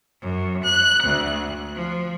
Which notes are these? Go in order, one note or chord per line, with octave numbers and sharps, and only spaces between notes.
F#2
F#6
D2
F3